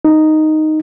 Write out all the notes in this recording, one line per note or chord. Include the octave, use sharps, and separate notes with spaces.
D#4